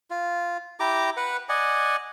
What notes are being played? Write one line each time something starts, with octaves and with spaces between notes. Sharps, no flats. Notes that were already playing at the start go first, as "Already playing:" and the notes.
F4
E4 G4 A#5 D6
B4 F#5
D5 D#5 F#5 G#5